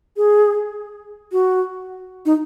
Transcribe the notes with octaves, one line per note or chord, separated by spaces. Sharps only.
G#4
F#4
D#4